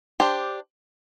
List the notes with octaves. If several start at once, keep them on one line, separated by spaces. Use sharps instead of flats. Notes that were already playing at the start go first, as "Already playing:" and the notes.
D4 G4 C5